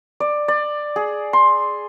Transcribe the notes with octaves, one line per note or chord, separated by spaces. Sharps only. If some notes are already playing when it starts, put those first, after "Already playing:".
D5
D5
G#4
C6